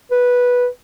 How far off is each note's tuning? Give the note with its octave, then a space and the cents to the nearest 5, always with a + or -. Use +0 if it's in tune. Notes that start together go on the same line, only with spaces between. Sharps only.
B4 -10